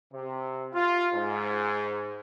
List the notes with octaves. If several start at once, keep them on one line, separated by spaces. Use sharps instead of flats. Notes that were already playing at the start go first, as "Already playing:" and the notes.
C3
F4
G#2